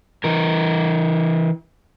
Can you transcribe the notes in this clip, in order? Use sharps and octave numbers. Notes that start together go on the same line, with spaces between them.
E3 A#4